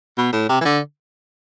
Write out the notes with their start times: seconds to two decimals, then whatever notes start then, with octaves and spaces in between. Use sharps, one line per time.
0.18 B2
0.32 A2
0.49 C3
0.61 E3
0.65 D3